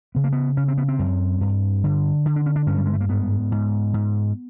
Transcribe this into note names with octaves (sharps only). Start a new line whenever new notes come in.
C#3 B3
A#3
B3
C#3 C#4
C4
B3
C4
F#2
G2
D3
D3
D4
C#4
D4
G2 C#4
G3
G#3
A3
A#3
G#2 B3
G#2
G#2